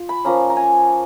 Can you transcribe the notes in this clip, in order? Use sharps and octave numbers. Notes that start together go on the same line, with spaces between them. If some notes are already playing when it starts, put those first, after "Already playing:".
Already playing: F4
B5
F3 A#3 C#4 A#5
A#5
G#5